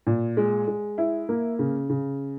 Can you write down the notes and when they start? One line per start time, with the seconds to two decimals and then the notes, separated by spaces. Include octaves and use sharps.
0.07 A#2
0.37 G#3
0.68 G#3
0.98 E4
1.29 A#3
1.59 C#3
1.90 C#3